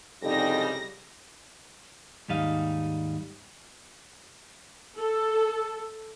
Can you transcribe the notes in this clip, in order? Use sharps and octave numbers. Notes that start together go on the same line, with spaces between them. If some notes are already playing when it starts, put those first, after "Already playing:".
C2 F2 G#2 C#3 G3 D#4 A#6
D#2 G#2 G3 D#4 F5
A4